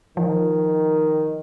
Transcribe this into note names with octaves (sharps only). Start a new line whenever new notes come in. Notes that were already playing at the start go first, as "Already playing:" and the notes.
D#3 F3